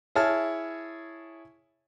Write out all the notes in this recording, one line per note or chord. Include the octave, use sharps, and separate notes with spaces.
E4 G#4 C#5 A5 F6